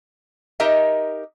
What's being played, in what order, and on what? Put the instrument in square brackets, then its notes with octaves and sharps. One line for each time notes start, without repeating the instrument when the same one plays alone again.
[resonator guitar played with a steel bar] D#4 G4 A#4 D#5 E5